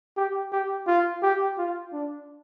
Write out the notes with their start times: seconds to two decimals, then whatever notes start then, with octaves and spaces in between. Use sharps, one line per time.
0.17 G4
0.52 G4
0.87 F4
1.22 G4
1.58 F4
1.93 D4